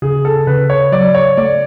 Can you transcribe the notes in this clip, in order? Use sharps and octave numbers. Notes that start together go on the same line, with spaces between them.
C#3 G#4
A4
C#3 B4
C#5
F#3 D5
C#5
A3 D5